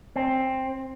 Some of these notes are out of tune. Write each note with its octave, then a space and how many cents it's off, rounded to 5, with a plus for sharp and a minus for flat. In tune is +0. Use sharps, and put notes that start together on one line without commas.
C4 +5